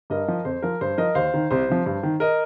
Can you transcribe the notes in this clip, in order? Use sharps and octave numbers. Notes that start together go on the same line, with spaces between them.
G2 A#4 D#5
F3
F2 C5
F3 A#4
G2 C5
F3 A#4 D#5
D#2 C5 F5
D#3
C2 C5
C3 F3
G2
D#3
A#4 D#5